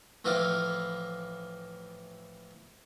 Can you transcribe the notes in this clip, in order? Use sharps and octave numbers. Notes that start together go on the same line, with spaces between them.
A2 E3 F3 D#5 F5 D6